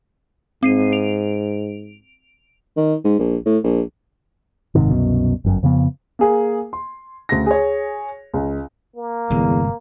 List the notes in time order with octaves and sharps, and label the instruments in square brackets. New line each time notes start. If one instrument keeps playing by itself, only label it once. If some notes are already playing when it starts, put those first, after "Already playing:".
[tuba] G#2 [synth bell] C4 C7 D#7
[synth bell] D7 F7
[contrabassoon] D#3
G#2
A#1
A2
A#1
[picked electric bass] F#1 G#2 C3 D#3
C2 F#2 B2
G1 F#2
F2 C#3 F3 B3
[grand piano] A#3 G#4
C6
D2 C#3 A#6
G#4 C#5
C#2
[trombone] A#3
[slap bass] G1 C3 G#3 [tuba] E2